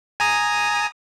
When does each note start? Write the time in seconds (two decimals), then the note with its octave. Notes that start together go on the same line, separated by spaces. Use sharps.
0.20 G#5 A#5 D#6